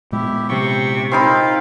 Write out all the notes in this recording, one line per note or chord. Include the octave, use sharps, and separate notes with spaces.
A#2 G#3 B3 E4 G4
C3 G5 C#6
C4 D#4 F4 A#4 F5 B5